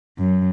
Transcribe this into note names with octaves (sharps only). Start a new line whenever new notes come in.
F#2